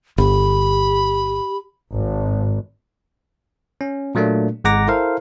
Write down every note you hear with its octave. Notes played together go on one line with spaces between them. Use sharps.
G1 G4 B5
G#1
C#4
A#2 F#3 A3 A#3 D4
G#1 G#3 F#5 A#5 D6 A#6
E4 A4 A#4 C5 F5